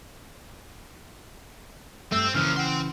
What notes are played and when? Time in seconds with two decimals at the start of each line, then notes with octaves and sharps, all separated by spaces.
2.12 G2 A3 C4 E6
2.35 A#2 C#3 E3 F3 F6
2.57 F#5 G5 C6